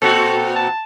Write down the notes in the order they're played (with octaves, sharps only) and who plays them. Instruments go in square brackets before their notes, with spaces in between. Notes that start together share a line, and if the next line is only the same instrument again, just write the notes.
[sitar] A#2 C4 F#4 [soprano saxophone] A4
[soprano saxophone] A5